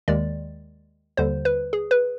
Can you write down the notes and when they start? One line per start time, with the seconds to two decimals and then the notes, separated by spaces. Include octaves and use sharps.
0.08 D#2 D#3 G#3 D5
1.17 D#2 D3 G3 C5
1.45 B4
1.73 G#4
1.91 B4